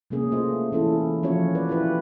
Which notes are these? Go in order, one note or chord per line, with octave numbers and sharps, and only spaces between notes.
C3 G#3 A#3 C#4 G#4
A3 F4 C5 D#5
E3 C#4 E4 A4
F3 C#4 F4 F#4 C#5
F3 B4 D5
E4 F4 G4 B4